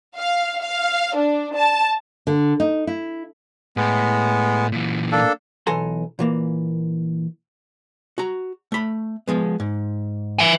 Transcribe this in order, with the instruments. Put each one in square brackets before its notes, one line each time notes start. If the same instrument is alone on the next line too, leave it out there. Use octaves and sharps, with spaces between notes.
[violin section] F5
F5
D4
A5
[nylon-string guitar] D3
D#4
E4
[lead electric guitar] A2 [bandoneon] G#3 B3
[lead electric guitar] A#2 E3
[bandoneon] A#3 D4 A4
[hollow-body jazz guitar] B1 E3 A4 G#5 A#5 C6
A#2 E3 A#3
F#4 A#5
A3 B5
F3 G#3 B3
G#2
[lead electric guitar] E5 G#5